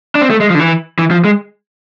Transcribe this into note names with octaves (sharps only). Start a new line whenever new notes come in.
D4
C4
A3
G#3
F3
D3
E3
E3
F3
G#3